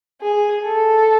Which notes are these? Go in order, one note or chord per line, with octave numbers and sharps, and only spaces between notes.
G#4
A4